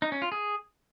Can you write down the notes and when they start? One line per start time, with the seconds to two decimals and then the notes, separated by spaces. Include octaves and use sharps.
0.02 D#4
0.12 C#4
0.22 F4
0.32 G#4